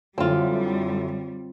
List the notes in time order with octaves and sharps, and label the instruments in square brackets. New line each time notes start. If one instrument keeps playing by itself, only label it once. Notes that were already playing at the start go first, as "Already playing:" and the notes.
[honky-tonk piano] F#2 D3 E4 [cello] G3 [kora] C4 F4